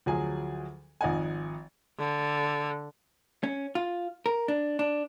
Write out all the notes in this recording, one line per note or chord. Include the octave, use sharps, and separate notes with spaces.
D2 F3 F#3 G#4 G#5
G#1 F3 D#4 F#5 G#5
D3
C#4
F4
A#4
D4
D4